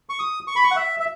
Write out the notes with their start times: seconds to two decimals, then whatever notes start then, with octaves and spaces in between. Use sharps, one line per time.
0.09 C#6
0.19 D#6
0.47 C#6
0.56 B5
0.64 C#6
0.71 F#5
0.76 E5
1.00 E5